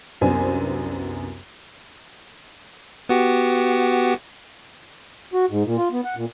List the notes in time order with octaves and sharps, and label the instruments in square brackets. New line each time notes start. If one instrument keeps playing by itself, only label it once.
[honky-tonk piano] C2 F#2 B3 D4 C5 G#5
[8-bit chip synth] B3 F#4 G4
[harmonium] F#4
G#2
A#2
F4
B3
F#5
A#2